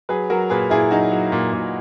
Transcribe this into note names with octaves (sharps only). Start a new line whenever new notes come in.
F#3 G#4 B4
F#3 F#4 A#4
A#2 G#4 B4
A#2 E4 G#4
F#3 D#4 F#4
F#3
A#2
A#2